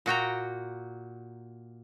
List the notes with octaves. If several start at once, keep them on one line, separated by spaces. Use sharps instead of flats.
A#2 F#4 G5 A#5